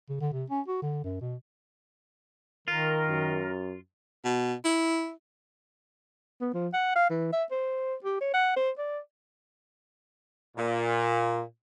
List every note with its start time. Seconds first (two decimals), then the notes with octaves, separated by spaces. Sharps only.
0.09 C#3
0.21 D3
0.33 C3
0.50 C#4
0.68 F#4
0.82 D3
1.04 F#2
1.21 B2
2.68 D#3 F4 A#4
3.09 F#2
4.25 B2
4.65 E4
6.41 B3
6.54 F3
6.73 F#5
6.96 F5
7.10 E3
7.32 E5
7.51 C5
8.04 G4
8.21 C#5
8.34 F#5
8.56 C5
8.78 D5
10.57 A#2